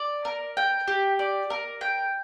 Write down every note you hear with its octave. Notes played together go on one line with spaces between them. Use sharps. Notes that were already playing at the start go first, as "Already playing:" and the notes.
Already playing: D5
A#4
G5
G4
D5
A#4
G5